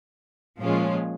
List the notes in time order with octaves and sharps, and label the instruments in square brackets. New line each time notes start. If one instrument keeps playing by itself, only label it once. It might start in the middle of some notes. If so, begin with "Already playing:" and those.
[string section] A#2 F3 G#3 C#4 F4